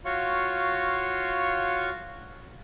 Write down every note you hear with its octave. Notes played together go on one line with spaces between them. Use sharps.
F4 F#4 C#5 F5 C6 C#6